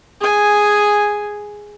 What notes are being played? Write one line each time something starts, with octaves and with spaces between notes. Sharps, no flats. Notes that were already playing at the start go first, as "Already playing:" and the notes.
G#4 G#5